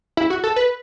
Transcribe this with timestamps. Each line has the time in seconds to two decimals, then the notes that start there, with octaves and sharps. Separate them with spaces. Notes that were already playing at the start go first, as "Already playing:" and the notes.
0.17 E4
0.30 F#4
0.44 A4
0.56 B4